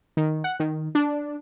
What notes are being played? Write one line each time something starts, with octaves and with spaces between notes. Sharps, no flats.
D#3
F#5
D#3
D4